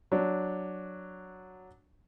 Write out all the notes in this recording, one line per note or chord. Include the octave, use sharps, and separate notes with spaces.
F#3 D4